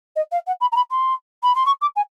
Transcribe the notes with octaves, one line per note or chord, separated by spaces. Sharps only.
D#5
F5
F#5
B5
A#5
B5
C6
B5
C6
C#6
D6
G#5